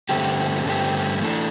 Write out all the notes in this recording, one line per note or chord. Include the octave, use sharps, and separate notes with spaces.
G2 D3 A3 C4 G4
G2 D3 A3 C4 G4
E3 A3 D4 A4